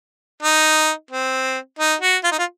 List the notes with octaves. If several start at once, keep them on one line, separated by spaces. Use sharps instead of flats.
D#4
C4
D#4
F#4
F4
D#4
F4